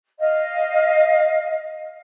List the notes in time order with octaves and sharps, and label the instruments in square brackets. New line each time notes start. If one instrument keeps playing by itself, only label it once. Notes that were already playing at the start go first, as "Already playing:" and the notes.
[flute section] D#5 F5